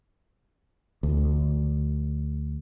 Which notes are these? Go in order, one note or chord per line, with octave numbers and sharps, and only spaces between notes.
D2